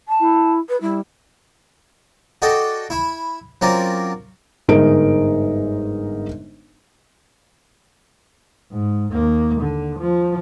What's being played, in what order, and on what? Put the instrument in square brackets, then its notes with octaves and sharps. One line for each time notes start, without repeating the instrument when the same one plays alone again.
[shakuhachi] A5
[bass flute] E4
[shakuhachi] B4
[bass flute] G3 [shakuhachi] E4
[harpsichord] F#4 A4 D5 D#5 G5
E4 E5 B5
F#3 C4 C#4 F4 A#4 D5
[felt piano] G1 G#2 G#3 D#4 A#4 D7
[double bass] G#2
D#2 A#3
D3
F3